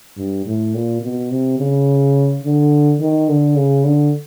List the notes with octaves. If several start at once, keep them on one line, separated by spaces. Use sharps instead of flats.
G2
A2
A#2
B2
C3
C#3
D3
D#3
D3
C#3
D3